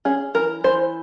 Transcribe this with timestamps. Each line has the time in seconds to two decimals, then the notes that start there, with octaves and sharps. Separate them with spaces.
0.05 C#4 G#4
0.34 E3 A#4
0.64 E3 C5